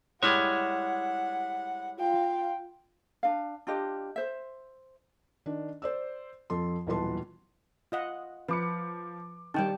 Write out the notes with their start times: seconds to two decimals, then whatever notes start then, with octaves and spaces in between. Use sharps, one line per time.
0.23 G3 G#3 E4 C#5 F#5
2.00 F4 F5 G5
3.23 D4 F5
3.67 D4 F4 G4 D#5
4.16 C5 E5
5.46 D#3 D4
5.82 C5 D5 E6
6.50 F2 F3 A4 C6
6.87 D#1 B1 E3 B4 A5 C6
7.92 F4 D#5 F#5
8.49 F3 B4 D6 C#7
9.54 D#3 G3 G5 A5